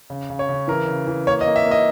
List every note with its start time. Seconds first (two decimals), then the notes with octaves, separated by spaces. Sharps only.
0.10 C#3
0.30 C#3
0.39 C#5
0.49 C#3
0.68 E3 A#4
0.88 C#3
1.07 E3
1.26 A#3 C#5
1.41 D#5
1.46 A#3
1.56 E5
1.66 A#3
1.71 D#5